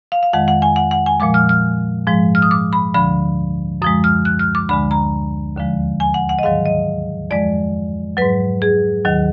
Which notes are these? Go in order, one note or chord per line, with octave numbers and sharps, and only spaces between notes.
F5
F5
F2 D#3 G#3 F#5
F#5
G#5
F#5
F#5
G#5
A#2 F3 G#3 D6
F6
F6
G#2 F3 G#3
F6
D#6
D6
B5
D2 D3 F3 B5
F#2 F3 G#3 D#6
F6
F#6
F6
D6
D2 D3 G#3 B5
A#5
D#2 D3 F3 G#3
G#5
F#5
F#5
D#5
G#2 D#3 F#3 F5
D#5
F2 F3 G#3 D5
G#2 F#3 B4
G#4
D#2 D#3 F#3